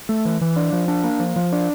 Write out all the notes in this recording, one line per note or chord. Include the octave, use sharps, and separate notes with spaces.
A3
E3
E3
D4
F3
D4
A#3
F3
F3
D4